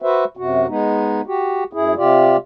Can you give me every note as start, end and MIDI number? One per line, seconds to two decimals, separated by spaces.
0.02 0.24 66
0.02 0.24 71
0.02 0.24 72
0.02 0.24 76
0.37 0.67 42
0.37 0.67 48
0.37 0.67 66
0.68 1.21 56
0.68 1.21 59
0.68 1.21 63
1.27 1.64 66
1.27 1.64 67
1.73 1.94 42
1.73 1.94 64
1.73 1.94 68
1.97 2.37 48
1.97 2.37 65
1.97 2.37 67
1.97 2.37 74